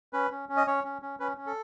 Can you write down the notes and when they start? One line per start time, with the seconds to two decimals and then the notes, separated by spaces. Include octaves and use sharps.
0.13 C#4 B4
0.31 C#4
0.49 C#4
0.57 D#5
0.67 C#4 C#5
0.84 C#4
1.02 C#4
1.20 C#4 B4
1.37 C#4
1.46 A4